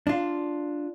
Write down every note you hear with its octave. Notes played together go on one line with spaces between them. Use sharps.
D4 F4